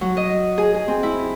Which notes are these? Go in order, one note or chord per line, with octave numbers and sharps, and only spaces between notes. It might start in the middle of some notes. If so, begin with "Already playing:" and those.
F#3
D#5
G#4
G#4
C4
E4